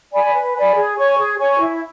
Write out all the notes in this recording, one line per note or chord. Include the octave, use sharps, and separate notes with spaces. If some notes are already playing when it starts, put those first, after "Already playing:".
D5 G#5 B5
B4
D5 G#5 B5
G#4
C#5 G#5 C#6
G#4
C#5 G#5 C#6
E4